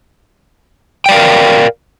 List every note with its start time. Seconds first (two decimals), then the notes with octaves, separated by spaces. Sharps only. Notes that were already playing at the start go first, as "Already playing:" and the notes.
1.06 G5
1.09 D5
1.11 F5
1.14 A#4